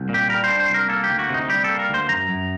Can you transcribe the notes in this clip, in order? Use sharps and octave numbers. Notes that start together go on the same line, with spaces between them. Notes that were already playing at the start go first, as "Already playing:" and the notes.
Already playing: C2
A#2
G4
G3 A#4
C5
D4
C5
C2 A#4
A#3 A4
G4
D2
F#4
C3 D#4
G3 G4
A4
A#3
A#4
D2 C5
F#2 A#5
F#2